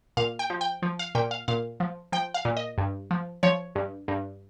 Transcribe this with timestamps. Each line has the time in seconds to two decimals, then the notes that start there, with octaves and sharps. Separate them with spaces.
0.17 A#2 F5
0.39 G5
0.50 F3
0.61 G5
0.82 F3
0.99 F5
1.15 A#2 G5
1.31 F5
1.48 A#2 F5
1.80 F3
2.12 F3 G5
2.34 F5
2.45 A#2
2.57 D#5
2.78 G2
3.11 F3
3.43 F3 C#5
3.75 G2
4.08 G2